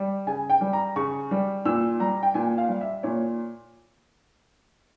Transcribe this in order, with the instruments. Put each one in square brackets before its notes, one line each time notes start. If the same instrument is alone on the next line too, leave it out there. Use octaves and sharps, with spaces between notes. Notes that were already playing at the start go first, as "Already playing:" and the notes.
Already playing: [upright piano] G3
C#3 G#5
G5
G3
A#5
C#3 C#6
G3
A#2 E6
G3 A#5
G5
A#2 G#5
F5
G3
E5
A#2 C#5